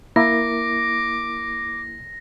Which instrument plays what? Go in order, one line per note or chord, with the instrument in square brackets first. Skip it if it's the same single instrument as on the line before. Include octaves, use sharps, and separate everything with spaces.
[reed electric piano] A#3 E4 A#4 [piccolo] D6 [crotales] A#6